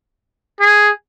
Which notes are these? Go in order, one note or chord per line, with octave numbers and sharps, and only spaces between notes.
G#4